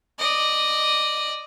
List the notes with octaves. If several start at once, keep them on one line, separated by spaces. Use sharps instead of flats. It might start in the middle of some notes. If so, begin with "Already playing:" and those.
D5 D#5